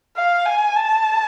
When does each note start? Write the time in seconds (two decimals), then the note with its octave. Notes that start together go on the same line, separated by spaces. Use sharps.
0.16 F5
0.46 G#5
0.76 A5